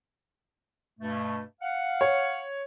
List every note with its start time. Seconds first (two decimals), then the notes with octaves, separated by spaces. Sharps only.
1.00 G2 B2 A3
1.62 F5 F#5
2.01 C#5